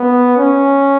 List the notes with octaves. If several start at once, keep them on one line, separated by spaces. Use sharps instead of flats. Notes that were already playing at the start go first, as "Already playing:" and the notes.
Already playing: B3
C#4